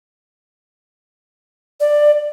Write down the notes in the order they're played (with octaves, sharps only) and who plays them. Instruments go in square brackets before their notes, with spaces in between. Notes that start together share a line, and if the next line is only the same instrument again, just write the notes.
[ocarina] D5